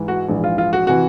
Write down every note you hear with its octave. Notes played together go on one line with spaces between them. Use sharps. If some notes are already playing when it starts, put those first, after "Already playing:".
Already playing: G#2 E3
F#4
A#1 G#2 E3
F4
F4
F#4
C3 E3 F#4